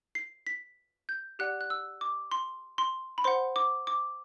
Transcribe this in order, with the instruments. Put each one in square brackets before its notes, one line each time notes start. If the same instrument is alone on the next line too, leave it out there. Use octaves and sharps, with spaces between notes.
[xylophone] C7
B6
G6
G4 D5 F#5 F#6
F#6
E6
D6
C6
C6
B5
C5 F#5 C6
D6
D6